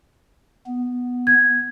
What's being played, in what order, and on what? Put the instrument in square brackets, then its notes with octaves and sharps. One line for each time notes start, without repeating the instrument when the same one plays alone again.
[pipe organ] B3
[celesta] G#6